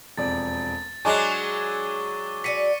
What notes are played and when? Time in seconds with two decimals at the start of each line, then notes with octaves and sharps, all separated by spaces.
0.17 E1 F2 D5 A6
1.05 F#3 G#3 D4 G#5 C#6 D6 F#6 G7
2.44 F#4 G4 D5 B6 C#7 D#7